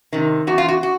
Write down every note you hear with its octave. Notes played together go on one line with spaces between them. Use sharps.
C3 D#3
E2 F#4
F4
F#4
F#4